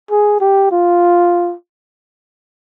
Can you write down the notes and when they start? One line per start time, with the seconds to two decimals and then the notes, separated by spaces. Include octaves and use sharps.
0.11 G#4
0.40 G4
0.72 F4